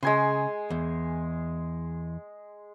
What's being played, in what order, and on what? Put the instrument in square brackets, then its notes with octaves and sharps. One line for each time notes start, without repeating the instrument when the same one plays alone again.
[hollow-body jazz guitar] C#3 [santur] G#3 G#5 C6
[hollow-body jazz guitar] E2